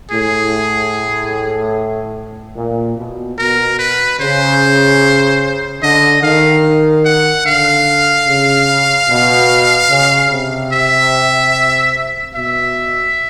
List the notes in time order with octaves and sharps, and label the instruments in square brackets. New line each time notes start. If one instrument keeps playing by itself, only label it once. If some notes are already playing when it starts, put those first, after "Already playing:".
[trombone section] A2 [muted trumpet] G#4
[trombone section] A#2
B2
[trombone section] B2 [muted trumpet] A#4
[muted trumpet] B4
[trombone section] C#3 [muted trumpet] C5
[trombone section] D3 [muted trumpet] D#5
[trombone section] D#3 [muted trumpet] F5
[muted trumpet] F#5
[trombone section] D3 [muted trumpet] F5
[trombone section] C#3
B2
C#3
C3
[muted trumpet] E5
[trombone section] B2 [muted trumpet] E5